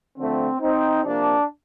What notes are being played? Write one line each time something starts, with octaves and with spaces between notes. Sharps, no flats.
D3 F3 A3 C4
C4 D#4
C3 F3 A#3 D4